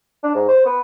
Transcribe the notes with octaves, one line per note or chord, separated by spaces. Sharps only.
D4
G#2
C5
B3